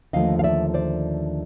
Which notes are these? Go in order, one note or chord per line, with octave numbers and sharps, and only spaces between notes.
D#2 D3 F3 A3 D#5 F5
F5
D5 E5
C5 D5